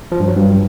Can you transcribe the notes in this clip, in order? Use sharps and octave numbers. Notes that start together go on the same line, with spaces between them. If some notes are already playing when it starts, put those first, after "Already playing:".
F3
G2
F#3
G2